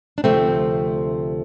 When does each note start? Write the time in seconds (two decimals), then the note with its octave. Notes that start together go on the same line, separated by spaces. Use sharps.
0.18 D4
0.24 D2 C3 F3 A3 C4